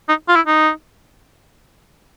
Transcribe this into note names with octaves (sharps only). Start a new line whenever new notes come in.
D#4
F4
E4
D#4